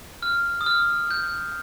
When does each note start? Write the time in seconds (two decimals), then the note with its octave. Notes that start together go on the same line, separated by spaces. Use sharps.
0.23 F6
0.61 D#6
0.66 F6
1.11 G6